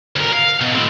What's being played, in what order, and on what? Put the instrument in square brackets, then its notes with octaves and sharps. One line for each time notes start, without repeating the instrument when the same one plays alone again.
[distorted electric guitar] D2 A#4
F5
B2
A2 C4